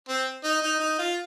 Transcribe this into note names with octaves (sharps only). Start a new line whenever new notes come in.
C4
D#4
D#4
D#4
F4